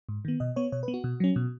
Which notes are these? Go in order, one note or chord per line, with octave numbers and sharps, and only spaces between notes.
G#2
D#3 B3
B2 D#5
B3 C#5
B2 C#5
B4
B3
F#4
B2
F#3 C#4
B2